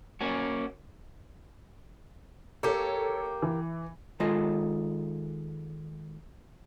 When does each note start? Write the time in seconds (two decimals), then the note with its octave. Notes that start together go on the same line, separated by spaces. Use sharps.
0.21 A#3 C#4 F#4
2.63 A#3 G4 A4 C#5
3.42 E3
4.20 D#3 G#3 F4 A4 D#5